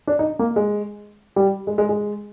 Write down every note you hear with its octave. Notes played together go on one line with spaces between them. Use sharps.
D4
D#4
A#3
G#3
G3
G#3
G#3
G#3